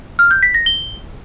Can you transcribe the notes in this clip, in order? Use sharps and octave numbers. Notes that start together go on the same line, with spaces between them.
F6
G6
B6
A#6
G7